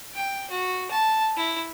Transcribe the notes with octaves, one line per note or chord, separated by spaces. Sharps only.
G5
F#4
A5
E4